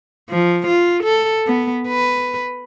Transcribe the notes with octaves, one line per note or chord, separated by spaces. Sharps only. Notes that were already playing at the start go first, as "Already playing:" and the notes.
F3
F4
A4
B3
B4